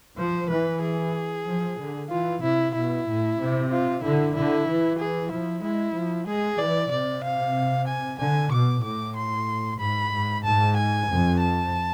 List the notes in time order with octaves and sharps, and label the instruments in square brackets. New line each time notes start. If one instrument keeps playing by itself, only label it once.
[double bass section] F3 [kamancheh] C5
[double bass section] E3 [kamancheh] B4
[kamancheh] G#4
[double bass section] F3
D3
[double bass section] E3 [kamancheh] F4
[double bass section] C3 [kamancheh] E4
[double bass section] B2 [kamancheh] E4
[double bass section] A2
C3
[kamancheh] F4
[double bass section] D3 [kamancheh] E4
[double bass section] D3 [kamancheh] E4
[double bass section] E3
[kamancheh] G#4
[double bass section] F3 [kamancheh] E4
[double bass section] G#3 [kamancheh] E4
[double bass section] F3
[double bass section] G#3 [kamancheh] G#4
[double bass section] E3 [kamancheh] D5
[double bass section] C3 [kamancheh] D5
[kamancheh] F5
G#5
[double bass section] D3 [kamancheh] G#5
[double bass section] B2 [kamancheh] D6
[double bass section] A2 [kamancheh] D6
[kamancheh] C6
[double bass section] G#2 [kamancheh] B5
[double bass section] G#2
[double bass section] G#2 [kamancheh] A5
[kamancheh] G#5
[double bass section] F2
[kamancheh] A5